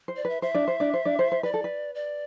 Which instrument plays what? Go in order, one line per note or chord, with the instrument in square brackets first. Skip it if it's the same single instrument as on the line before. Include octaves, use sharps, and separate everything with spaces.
[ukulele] C5
[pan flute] D5
[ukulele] B4 [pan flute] E5
[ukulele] C5 [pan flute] E5
[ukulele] D4 D5
C5
D4 D5
C5
D4 D5
C5
C5
[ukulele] B4 [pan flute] D5
[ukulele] A4
B4
[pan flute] D5